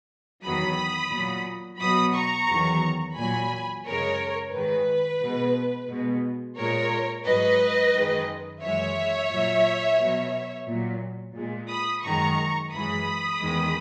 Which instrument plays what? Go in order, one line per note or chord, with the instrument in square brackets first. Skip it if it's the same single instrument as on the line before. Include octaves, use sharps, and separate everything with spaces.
[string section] E2 D#3 F#3 B5 D#6
A#2 F#3
B2 F#3 B5 D#6
A#5 C#6
E2 D#3 F#3
A#2 F#3 G#5 B5
F#2 C#3 G#3 A#4 C#5
G#2 D#3 G#3 B4
B2 G#3
B2 G#3
A#2 G#3 A#4 C#5
G#2 F#3 B4 D#5
F#2 D#3 G#3
F#2 E3 G#3 C#5 E5
A#2 F#3
B2 F#3
A#2 F#3
A#2 G#3
B5 D#6
F#2 D#3 G#3 A#5 C#6
F#2 E3 G#3 B5 D#6
E2 D#3 G#3